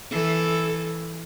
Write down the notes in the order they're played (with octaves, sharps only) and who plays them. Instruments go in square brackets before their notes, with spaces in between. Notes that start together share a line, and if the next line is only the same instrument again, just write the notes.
[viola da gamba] E3 A4